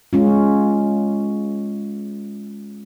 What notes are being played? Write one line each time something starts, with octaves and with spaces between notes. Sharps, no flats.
G#3 C#4 F4